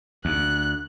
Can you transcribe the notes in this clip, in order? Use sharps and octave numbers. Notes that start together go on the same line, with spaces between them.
D2 F#6